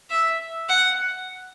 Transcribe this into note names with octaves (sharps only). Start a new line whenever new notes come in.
E5
F#5